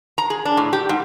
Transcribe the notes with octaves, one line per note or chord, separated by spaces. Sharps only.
A#5
G#4
D4
A2
G4
G#2